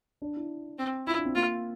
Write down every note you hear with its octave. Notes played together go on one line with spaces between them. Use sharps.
D4
E4
C4
E4 F4
D4
C4
A#3 F4